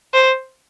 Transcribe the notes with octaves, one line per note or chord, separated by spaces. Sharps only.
C5